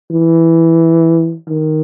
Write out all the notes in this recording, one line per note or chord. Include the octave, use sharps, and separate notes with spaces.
E3
D#3